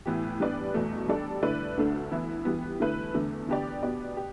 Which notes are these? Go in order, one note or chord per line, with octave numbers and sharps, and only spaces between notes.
A2 E3 B3 G4
G3 B3 D4 B4 D5
E2 B2 A3
G3 D4 A4 D5
D3 A3 E4 B4 D5
D2 D3 A3 D4 A4
E3 B3 E4
E3 G3 B3
D3 A3 E4 B4
E2 D3 A3
D3 B3 G4 D5
B2 B3 G4 D5
G4